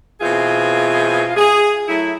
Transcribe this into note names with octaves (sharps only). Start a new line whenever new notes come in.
B2 E3 C4 F4 G#4
G#4
F#3 A3 E4